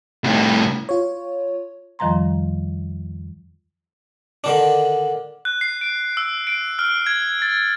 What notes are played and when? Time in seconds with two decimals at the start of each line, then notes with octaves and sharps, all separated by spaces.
0.24 C2 A2
0.89 F4 C#5
1.99 F2 D#3 F3 G3 A#5 C6
4.44 D3 D#3 D4
5.45 F#6
5.61 C7
5.81 D7
6.17 E6
6.47 D7
6.79 F6
7.07 G#6
7.42 A6